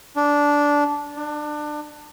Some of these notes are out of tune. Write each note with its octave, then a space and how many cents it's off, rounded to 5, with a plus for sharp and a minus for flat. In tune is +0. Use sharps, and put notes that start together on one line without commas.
D4 -10
D4 +25